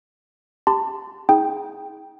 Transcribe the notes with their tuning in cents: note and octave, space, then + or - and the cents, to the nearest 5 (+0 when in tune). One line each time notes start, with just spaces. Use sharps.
G4 +0 A5 +20 C6 -35
D#4 +40 G#4 +0 G5 -5